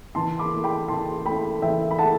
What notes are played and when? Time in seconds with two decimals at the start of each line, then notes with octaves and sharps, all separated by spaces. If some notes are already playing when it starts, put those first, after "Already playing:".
0.15 E3 A5 C6
0.39 B5 D6
0.52 A3 E4
0.64 G5 B5
0.88 E3 A5 C6
1.25 A3 E4 G5 B5
1.62 E3 E5 G5
1.91 B5
1.99 A3 E4 F#5 A5